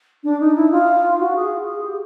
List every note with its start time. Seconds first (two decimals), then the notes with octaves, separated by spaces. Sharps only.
0.23 D4
0.40 D#4
0.55 E4
0.71 F4
1.19 F#4
1.35 G#4
1.66 G#4
1.83 G4